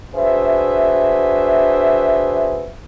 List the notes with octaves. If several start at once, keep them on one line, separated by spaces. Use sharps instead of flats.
D4 F#4 G#4 B4 C5 E5